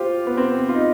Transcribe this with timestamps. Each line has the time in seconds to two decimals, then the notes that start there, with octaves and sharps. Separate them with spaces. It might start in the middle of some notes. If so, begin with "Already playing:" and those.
Already playing: F4 G4 C5
0.27 B3
0.37 C4
0.69 F4
0.75 D#4